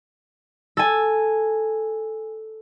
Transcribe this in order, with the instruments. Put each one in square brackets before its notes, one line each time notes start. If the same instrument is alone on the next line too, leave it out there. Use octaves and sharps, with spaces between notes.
[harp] A4 G#5